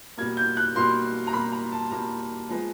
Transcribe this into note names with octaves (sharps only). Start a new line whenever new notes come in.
B2 G3 A#3 G#6
G6
F#6
B2 G3 A#3 C6
A#5
B2 G3 A#3 B5
A#5
A5
B2 G3 A#3 A#5
F3 G#3 B3